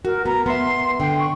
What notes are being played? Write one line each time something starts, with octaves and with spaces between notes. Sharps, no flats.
F#4 A#4
B3 A#5
B3 E5 C6
D3 G5
C#6